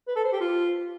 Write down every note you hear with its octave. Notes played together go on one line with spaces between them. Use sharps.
B4
A4
C5
G4
F4